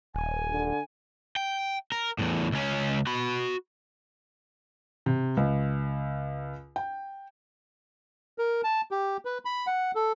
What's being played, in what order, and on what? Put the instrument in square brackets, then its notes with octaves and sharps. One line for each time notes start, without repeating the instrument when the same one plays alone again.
[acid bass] D#1 [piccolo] G#5
[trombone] D3
[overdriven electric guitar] G5
A#4
E2 A2
C#2 C#4
F#4 B5
[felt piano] C3
C#2
G5
[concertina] A#4
A5
G4
B4
B5
F#5
A4